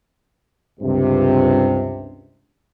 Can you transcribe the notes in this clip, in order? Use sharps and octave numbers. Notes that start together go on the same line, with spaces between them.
C#2 G2 C3